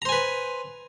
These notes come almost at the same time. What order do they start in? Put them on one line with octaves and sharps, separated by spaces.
A#5 C5 G#5 B4